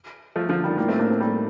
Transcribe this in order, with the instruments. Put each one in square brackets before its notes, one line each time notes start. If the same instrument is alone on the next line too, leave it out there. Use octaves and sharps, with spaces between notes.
[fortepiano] F3 A3
D3 F3
D#3 G3
[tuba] A2 [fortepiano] G3 A#3
[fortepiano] A3 C4
A#3 D4
A3 C4
G3 A#3